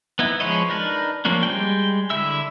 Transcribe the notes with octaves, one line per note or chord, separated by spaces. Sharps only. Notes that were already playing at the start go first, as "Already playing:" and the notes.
B3 D#4 E4
F3 G#3 B4 C#5 D#5
D4 D#4 A#4 B4
F3 A#3 C#4 D4
G3 G#3 G5
D3 E4 E5 E6